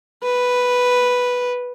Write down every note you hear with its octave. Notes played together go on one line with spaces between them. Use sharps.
B4